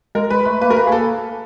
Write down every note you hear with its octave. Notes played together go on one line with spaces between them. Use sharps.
G#3 A#4
G#3 B4
A3 B4
A#3 B4
A3 A#4
A#3 B4
G#4
A4